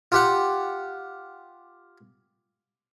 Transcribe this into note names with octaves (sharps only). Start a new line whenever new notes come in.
F4 G4 F#5